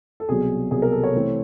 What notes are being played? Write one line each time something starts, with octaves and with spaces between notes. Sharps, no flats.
A4
C2 B2 F#3 G#4
C2 B2 F#3 G#4
A#4
A4
C#5
C3 E3 A3 C4